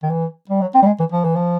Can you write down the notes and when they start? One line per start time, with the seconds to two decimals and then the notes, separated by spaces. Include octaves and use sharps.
0.03 D#3
0.10 E3
0.49 G3
0.61 F#3
0.74 C4
0.83 G3
0.86 G#3
1.00 E3
1.12 F3
1.25 E3
1.36 F3